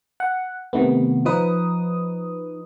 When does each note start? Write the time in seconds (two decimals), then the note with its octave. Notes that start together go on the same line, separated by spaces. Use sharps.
0.20 F#5
0.73 C3 D#3 A3 B3
1.25 F3 D#4 B4 D#6